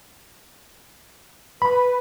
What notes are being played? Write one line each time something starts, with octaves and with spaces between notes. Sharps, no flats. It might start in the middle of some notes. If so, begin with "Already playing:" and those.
B4 B5